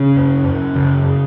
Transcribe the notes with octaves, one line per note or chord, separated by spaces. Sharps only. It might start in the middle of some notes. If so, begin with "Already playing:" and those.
Already playing: C#3 C#4
F#2
F#2
C#3